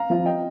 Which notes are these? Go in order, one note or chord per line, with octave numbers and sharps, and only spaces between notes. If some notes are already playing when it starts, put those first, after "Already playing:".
Already playing: F5 A#5
F3 C4 F4
D#5 G5